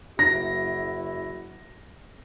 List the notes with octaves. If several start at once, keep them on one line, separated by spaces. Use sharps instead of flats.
F#1 E4 F#4 A#6